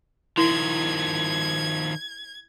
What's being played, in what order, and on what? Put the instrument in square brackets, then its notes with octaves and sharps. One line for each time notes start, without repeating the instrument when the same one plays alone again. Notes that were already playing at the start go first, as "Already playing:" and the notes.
[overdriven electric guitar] D#3 F3 [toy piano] E4 C6 [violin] G#6